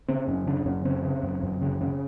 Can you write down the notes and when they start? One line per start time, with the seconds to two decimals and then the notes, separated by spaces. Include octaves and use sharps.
0.08 C#3 C4
0.28 F#2 C#4
0.47 C#3 D4
0.65 F#2 C#4
0.85 C#3 C4
1.05 C#3
1.23 F#2
1.43 F#2
1.61 C#3
1.81 C#3